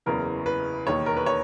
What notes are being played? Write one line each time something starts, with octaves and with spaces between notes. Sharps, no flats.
F#1 E2 C#3 E3 A#4
B4
E1 D#2 D#3 C#5
A#4
B4
C#5